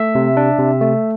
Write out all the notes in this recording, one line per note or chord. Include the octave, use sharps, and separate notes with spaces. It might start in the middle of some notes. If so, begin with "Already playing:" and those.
Already playing: A3 E5
C3
D4
C3
A3